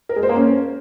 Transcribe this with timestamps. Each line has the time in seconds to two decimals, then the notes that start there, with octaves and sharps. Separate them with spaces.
0.09 A#4
0.16 G#3
0.23 C5
0.29 A#3
0.36 C#4